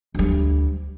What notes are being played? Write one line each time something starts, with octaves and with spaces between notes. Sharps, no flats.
D2 G3